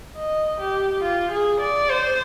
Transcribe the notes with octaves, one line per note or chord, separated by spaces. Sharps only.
D#5
G4
F4
G#4
D5
C5